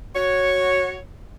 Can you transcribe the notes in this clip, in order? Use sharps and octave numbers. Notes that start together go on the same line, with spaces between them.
F#4 C#5